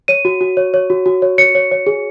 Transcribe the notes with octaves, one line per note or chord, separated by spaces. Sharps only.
C#5 D#7
F#4
F#4
C#5
C#5
F#4
F#4
C#5
C#5 C#7
C#5
C#5
G#4